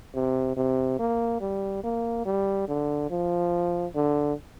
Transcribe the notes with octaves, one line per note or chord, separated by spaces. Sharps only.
C3
C3
A#3
G3
A#3
G3
D3
F3
D3